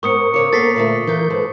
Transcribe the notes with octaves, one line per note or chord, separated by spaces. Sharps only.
G#2 B3 A#4 C5 C#6 D#6 C#7
C#3 C#5 D6 C#7
A#3 B3 A4 A6 B6 C7
A#2 D3 A3
E3 F4 A#4 B4 G6
G#2 A4 B4 C5